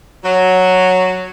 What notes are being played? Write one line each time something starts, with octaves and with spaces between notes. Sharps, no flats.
F#3